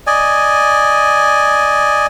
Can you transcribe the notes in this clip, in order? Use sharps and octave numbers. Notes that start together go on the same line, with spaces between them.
D5 D#5 G#5